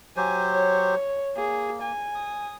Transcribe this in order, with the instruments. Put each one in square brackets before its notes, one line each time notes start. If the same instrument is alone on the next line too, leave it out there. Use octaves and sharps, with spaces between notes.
[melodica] F#3 G4 C5 [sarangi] G#5
[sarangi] C#5
[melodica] A#3 [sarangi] G#4
[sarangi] G#5
[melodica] D#6